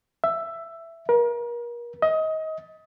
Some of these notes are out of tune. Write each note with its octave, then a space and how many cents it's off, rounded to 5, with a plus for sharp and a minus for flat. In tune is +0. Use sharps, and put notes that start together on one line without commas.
E5 +10
A#4 +35
D#5 +25